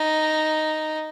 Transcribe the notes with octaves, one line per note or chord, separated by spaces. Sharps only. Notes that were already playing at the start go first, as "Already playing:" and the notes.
Already playing: D#4